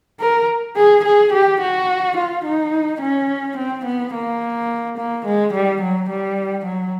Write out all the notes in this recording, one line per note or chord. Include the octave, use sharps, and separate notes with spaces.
A#4
G#4
G#4
G4
F#4
F4
D#4
C#4
C4
B3
A#3
A#3
G#3
G3
F#3
G3
F#3